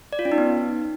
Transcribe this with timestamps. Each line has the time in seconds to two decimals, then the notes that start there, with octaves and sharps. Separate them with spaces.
0.13 D5
0.19 F4
0.25 C#4
0.32 D#4
0.38 B3